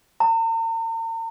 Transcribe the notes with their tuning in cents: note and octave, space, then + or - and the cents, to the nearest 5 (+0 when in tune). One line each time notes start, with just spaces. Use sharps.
A#5 -45